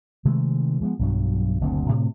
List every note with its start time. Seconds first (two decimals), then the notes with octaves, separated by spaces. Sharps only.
0.25 C3 D#3 G#3 A3
0.80 F3 G#3 A3 B3
0.99 B1 G2 F#3
1.61 F#1 D2 B2 C4
1.90 A2 C3